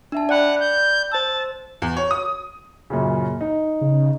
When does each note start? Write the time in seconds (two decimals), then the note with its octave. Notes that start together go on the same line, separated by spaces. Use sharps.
0.12 D4 E5 A5
0.29 D5 F#5 G5 B5
0.60 G6
1.12 C5 A5 E6
1.82 E2
1.97 C#5
2.11 D#6
2.90 F#2 A#2 C#3
3.41 D#4
3.81 C#3